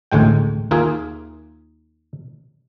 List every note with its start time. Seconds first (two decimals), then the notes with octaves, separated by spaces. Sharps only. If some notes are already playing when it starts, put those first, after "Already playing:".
0.12 A1 D2 A2 G#3 G5
0.71 D#2 A#3 F4 G#4 E5